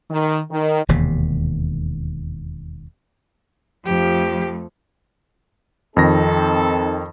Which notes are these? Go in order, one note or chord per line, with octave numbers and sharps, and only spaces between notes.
D#3
D#3
E1 D#2 C3
F2 F3 A3 G4
F2 D#3 C4 D#4 A4 A#6